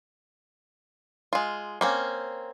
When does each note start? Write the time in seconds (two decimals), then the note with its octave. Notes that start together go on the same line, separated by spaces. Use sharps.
1.33 G#3 F4
1.81 A#3 C4 C#4